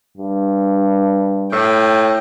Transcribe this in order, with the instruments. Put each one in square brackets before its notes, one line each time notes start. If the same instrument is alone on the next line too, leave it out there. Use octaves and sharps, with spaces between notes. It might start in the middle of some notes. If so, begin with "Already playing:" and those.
[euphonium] G2
[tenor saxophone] A2 [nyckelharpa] G5